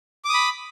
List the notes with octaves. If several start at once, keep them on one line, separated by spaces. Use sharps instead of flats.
B5 D6 D#6